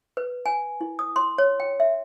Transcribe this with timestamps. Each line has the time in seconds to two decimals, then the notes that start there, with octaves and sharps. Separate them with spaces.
0.17 B4
0.46 G#5
0.81 E4
0.99 D#6
1.16 C6
1.38 C#5
1.60 G5
1.80 E5